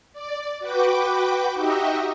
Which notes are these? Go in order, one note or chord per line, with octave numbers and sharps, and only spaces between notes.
D5
F#4 B4 G5 D6
D#4 F#4 G4 D#5 E5